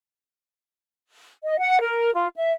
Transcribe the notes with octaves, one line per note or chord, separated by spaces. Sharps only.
D#5
F#5
A#4
F4
E5